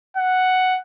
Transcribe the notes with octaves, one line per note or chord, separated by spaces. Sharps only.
F#5